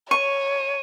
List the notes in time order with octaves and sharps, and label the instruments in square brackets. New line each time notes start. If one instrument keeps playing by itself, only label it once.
[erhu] C#5 [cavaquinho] C#6 [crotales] D#7